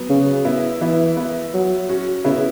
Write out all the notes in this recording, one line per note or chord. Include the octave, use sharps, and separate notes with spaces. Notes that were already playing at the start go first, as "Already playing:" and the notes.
Already playing: F#3 B3
C#3
B3 E4
E3 B3 E4
B3 E4
F#3
C#4 F#4
C#3 B3 E4